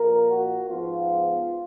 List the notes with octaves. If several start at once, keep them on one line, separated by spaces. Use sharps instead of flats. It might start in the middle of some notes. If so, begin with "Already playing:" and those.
Already playing: A#2 F3 A#3 A#4
F#4
G#2 F3 B3 F4